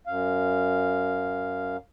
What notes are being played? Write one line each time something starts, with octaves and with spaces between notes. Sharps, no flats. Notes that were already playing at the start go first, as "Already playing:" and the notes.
F#2 F5